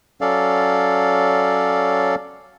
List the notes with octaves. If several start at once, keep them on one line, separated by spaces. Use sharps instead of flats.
F#3 C#4 A4 D5 F5